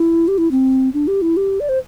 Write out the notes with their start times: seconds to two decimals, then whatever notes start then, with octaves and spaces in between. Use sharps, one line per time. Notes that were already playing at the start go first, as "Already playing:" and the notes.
Already playing: E4
0.28 G4
0.38 E4
0.51 C4
0.94 D4
1.08 G4
1.22 E4
1.37 G4
1.60 D5
1.69 C5